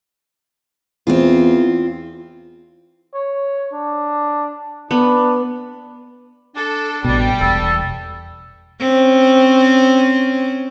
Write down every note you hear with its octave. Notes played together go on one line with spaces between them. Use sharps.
E2 C4 F4
C#5
D4
B3 D4
D4 A4
A1 B2 G3
E1 A4
C4 C#4